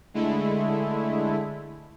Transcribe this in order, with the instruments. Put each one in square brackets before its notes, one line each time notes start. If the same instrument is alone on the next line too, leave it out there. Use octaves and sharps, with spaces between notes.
[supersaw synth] D3 G#3 A3 E4